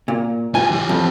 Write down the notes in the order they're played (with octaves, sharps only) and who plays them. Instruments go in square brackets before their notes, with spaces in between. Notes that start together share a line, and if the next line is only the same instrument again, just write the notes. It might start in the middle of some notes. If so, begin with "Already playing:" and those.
[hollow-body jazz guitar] A#2
[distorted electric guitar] F4 G4 [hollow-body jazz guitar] G#5
[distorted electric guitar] E3 G4
[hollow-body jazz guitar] F2